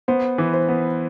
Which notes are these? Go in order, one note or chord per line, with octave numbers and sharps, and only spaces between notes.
B3 C5
E3
C5
B3